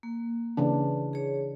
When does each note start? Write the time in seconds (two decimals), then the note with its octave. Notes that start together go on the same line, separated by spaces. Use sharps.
0.03 A#3
0.57 C#3 E3 D4
1.13 G#4 C#5